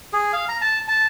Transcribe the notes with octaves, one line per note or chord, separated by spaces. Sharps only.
G#4
F5
A#5
A5
A5